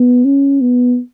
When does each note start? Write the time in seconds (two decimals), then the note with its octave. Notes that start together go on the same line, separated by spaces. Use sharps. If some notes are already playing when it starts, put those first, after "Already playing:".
Already playing: B3
0.25 C#4
0.61 B3